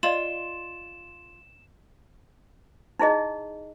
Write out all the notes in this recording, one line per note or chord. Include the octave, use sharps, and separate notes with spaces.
F4 D5 D#5 E7 F#7
D#4 E4 G#4 D#5